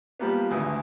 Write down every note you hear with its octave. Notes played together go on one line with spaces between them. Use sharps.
F3 G3 A#3 B3
G#1 D2 E3 D#6